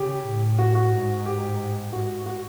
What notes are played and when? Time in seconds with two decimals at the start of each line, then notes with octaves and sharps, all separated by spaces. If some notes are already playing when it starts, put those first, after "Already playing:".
Already playing: C#3 G4
0.26 A2
0.59 F#4
0.75 F#4
0.92 G#2
1.26 G4
1.93 G#2 F#4
2.26 F#4